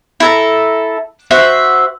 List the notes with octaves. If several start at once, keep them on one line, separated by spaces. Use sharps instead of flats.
E4 A4 A#5
F#4 C5 E5 F#5